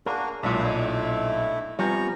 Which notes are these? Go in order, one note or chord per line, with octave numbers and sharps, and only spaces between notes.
A#3 D4 F#4 G#4 A#4
B1 A#2 G#3 D4 E4 E5
A3 D4 E4 D#5
F3 G3 B3 C4 G#5 A#5 C#6